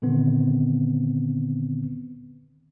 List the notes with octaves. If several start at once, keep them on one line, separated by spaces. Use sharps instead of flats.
A#2 D3 D#3 B3 C4